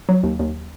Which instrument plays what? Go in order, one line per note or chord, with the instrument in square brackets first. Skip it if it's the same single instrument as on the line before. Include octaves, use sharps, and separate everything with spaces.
[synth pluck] F#3
D#2
D#2